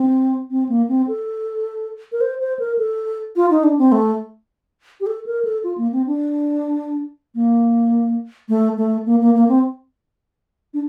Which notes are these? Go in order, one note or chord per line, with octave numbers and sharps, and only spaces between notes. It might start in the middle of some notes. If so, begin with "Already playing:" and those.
Already playing: C4
C4
A#3
C4
A4
A#4
C5
C5
A#4
A4
F4
D#4
D4
C4
A3
G4
A4
A#4
A4
F4
A#3
C4
D4
A#3
A3
A3
A#3
A#3
A#3
C4
D4